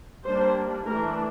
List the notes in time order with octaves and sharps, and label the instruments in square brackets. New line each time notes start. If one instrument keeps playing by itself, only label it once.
[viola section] G3 A#3 D4 C5
E3 A3 D4 A#4